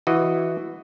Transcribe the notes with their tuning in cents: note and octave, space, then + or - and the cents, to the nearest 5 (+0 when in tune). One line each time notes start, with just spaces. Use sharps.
E3 +0 F#4 -5 D#5 -5